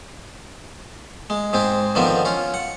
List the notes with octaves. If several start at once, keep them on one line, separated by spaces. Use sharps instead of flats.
G#3
G#2 G#3 C4
D3 D#3 F3 B3 C4
C#4 F4
F#5